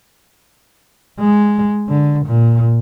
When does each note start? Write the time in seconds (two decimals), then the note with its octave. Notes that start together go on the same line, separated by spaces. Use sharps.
1.19 G#3
1.89 D3
2.25 A#2